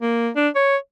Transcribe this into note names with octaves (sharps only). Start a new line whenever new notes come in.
A#3
D4
C#5